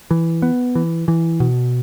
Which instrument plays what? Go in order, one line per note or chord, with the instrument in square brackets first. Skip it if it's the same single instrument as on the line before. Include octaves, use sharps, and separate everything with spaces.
[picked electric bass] E3
B3
E3
E3
B2